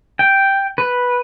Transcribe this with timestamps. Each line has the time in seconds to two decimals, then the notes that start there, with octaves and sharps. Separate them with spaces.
0.19 G5
0.78 B4